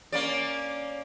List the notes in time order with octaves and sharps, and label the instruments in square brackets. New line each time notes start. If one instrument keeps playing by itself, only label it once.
[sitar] A#3 C#4 D5